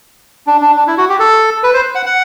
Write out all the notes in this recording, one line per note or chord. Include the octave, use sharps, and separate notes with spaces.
D4
D4
D4
E4
F#4
G4
A4
B4
C5
F#5
F#5